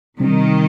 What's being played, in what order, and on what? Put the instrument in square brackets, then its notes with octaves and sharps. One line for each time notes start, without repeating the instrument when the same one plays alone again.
[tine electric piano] C3 G3 C4 [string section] D#3